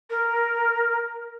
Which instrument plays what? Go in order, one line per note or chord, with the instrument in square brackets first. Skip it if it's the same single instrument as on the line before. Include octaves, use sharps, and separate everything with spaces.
[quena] A#4